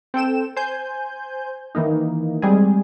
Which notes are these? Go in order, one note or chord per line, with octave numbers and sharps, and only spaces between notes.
C4 A4 G5 E7
C5 G#5 G6
D#3 E3 A#3 D#4
G3 G#3 C4 G#4